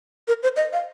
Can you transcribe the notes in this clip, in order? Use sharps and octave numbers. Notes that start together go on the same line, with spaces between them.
A#4
C5
D#5
F5